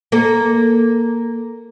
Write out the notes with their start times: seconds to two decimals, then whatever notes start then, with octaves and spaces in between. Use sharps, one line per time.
0.12 A#3 A4